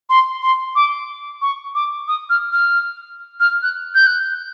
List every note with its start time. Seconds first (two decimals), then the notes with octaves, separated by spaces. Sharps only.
0.09 C6
0.42 C6
0.75 D6
1.42 C#6
1.75 D6
2.08 D#6
2.30 F6
2.52 F6
3.40 F6
3.63 F#6
3.95 G6
4.07 F#6